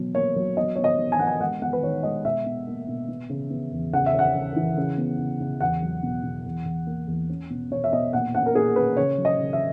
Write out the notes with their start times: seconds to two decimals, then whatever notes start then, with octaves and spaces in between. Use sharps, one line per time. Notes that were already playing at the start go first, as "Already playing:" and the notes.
Already playing: B2 F#3
0.15 A#3 C#5
0.36 F#3
0.57 B3 D#5
0.76 B3 C#5
0.84 D#5
0.98 B3
1.12 G#5
1.19 B3 F#5
1.27 G#5
1.40 G#3 F#5
1.62 B3 F#5
1.73 B4
1.82 D#3 C#5
2.03 G#3 D#5
2.24 B2 E5
2.46 B2
2.67 A#3
2.88 B2
3.08 B3
3.30 C#3
3.50 B3
3.72 E2
3.93 C#3 F#5
4.06 E5
4.14 C#4 F#5
4.36 C#3
4.56 E3
4.77 C#3
4.98 B3
5.18 C#3
5.40 C#3
5.61 E2 F#5
5.82 F#3
6.03 B2
6.23 B2
6.45 E2
6.65 E2
6.87 A#3
7.08 E2
7.29 C#4
7.50 B2
7.71 B2 C#5
7.84 E5
7.93 B2 D#5
8.13 A#2 F#5
8.34 C#4 F#5
8.46 A#4
8.55 A#2 G#4
8.76 C#4 B4
8.97 C#3 C#5
9.18 F#3
9.25 D#5
9.39 C#3
9.53 E5